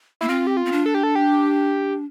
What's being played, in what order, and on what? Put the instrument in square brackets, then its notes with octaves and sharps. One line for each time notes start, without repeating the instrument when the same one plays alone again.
[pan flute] A#3 [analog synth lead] E4
[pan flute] C4 [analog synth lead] F4
[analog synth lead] G4
F4
[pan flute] C4
D4
[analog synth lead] A4
G4
A4
G4